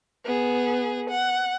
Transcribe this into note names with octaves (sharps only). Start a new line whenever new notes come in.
B3 G#4
F#5